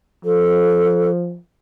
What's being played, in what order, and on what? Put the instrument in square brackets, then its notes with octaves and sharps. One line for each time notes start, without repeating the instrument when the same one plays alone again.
[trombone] F3 [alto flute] A4